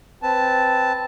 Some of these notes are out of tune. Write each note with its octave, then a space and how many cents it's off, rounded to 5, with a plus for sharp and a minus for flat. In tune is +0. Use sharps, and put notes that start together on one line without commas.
C4 +0 B4 +0 A5 +0